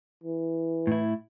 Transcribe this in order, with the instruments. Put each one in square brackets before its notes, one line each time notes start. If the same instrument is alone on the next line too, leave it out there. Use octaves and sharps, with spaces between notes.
[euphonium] E3
[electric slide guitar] A2 E4